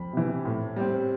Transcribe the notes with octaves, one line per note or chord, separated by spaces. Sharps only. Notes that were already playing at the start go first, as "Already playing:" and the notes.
Already playing: F2 B5
C3 E3
A2
G3 C4